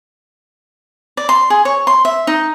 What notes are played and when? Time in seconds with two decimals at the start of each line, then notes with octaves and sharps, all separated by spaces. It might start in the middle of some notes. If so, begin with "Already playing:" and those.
1.17 D5
1.29 C6
1.50 G#4
1.65 C#5
1.87 C6
2.05 E5
2.27 D#4